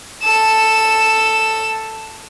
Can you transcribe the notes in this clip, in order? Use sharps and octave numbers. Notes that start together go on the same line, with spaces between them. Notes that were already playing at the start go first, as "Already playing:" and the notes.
A4 E7